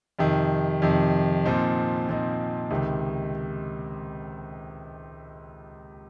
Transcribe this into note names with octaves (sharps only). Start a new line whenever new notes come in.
F2 C3 D#3
F2 C3 D#3
A#2 F3 C4 D#4
A#2 F3 C4 D#4
C#2 C3 D#3